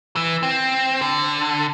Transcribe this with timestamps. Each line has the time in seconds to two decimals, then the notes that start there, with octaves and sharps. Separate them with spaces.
0.16 E3
0.43 C4
1.01 D3